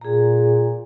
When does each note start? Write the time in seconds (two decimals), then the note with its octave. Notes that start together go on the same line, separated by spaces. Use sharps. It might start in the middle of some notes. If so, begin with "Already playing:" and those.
0.01 A#2 G#4 A#5